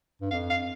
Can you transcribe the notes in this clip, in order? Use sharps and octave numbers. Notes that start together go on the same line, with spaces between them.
G2
F2 F5
F5